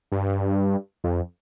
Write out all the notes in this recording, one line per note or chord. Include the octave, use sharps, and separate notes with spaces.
G2
F2